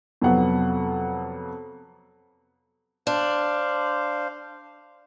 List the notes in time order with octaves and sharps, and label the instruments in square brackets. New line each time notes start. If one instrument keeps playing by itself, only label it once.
[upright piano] F2 C3 F#3 B3 F#5
[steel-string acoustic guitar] D4 [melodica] C5 F5